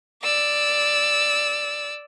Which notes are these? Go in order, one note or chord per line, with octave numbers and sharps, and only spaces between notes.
D5 E6